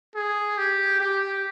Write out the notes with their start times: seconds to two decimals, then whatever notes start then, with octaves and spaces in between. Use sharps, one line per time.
0.15 G#4
0.58 G4
1.00 G4